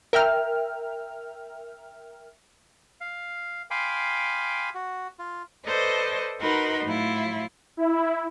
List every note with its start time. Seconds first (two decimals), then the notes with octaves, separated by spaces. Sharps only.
0.13 A#4 E5 G5 F6
3.01 F5
3.71 F5 G5 G#5 B5 C6 D6
4.75 F#4
5.19 F4
5.66 A4 B4 C5 D5 D#5
6.39 D#4 F#4 A#4 B4 B5 C6
6.84 A2 F#3 E4 F4
7.77 E4